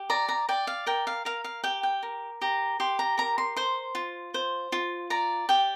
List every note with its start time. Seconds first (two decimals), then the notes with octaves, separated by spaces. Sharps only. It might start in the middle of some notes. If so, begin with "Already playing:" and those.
Already playing: G4
0.10 D5 A#5
0.29 A#5
0.49 D5 G5
0.67 F5
0.87 A#4 G5
1.07 F5
1.25 A#4 F5
1.44 F5
1.64 G4 G5
1.83 G5
2.03 A#4
2.42 G4 A#5
2.80 G4 C6
2.99 A#5
3.18 A#4 A#5
3.38 C6
3.57 C5 C6
3.95 F4
4.34 C5
4.72 F4
5.10 D5 A#5
5.49 G4 G5